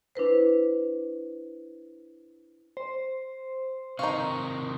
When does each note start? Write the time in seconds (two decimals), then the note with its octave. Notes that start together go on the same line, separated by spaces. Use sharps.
0.15 D4 E4 B4 C5
2.77 C5
3.99 C3 D#3 D#4 F5 C#6